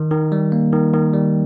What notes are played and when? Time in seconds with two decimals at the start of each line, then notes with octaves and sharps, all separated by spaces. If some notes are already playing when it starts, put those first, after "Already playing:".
Already playing: D#3
0.11 D#3
0.32 G3
0.52 A#3
0.73 D#3
0.94 D#3
1.14 G3